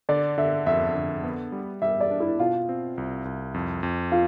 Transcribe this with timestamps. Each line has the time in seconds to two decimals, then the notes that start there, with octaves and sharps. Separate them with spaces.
0.09 D3 D5
0.38 D3 E5
0.66 F2 E5
0.95 D3
1.24 B3
1.52 G3
1.82 G3 E5
2.01 D5
2.11 D4
2.20 E4
2.39 B2 F4
2.69 C4
2.98 C2
3.25 C2
3.54 F2
3.83 F2
4.12 F4